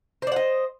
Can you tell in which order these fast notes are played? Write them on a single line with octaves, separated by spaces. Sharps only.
C5 D5 F#5 D#5